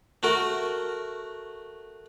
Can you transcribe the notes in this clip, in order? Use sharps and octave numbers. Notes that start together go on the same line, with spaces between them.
A3 F#4 A#4